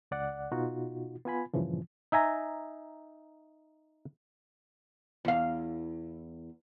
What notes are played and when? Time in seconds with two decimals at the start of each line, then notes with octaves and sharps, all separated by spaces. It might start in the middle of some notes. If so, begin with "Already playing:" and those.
0.11 C#2 D5 F#5
0.52 B2 D#4 F4 F#4
1.25 B3 F4 G#5 B5
1.54 G2 A#2 C#3 E3 F3
2.12 D#4 E5 G#5 A#5
5.25 E2 F5